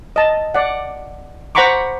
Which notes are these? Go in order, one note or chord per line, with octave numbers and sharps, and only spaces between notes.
D#5 A5
D5 F#5
C5 F#5 A#5 B5 C#6 D6